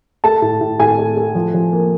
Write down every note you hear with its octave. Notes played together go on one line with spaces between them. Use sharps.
A3 A5
A2
A2
A2 G#5
A3
A3
F3
F3
A#3